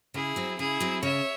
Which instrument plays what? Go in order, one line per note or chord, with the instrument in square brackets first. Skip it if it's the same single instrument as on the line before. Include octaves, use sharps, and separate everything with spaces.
[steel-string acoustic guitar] C#3 [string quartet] E4 G#4
[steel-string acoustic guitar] F#3 C4
[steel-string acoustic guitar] C#3 [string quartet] E4 G#4
[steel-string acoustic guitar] F#3 C4
[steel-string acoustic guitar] C#3 [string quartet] C#5 E5